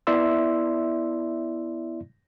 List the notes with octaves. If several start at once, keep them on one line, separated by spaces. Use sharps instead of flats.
B3 E4 D5 E5 C6 E6